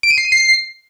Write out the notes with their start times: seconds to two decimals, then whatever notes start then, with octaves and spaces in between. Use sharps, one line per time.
0.03 D7
0.10 D#7
0.18 C7
0.25 D#7
0.32 C7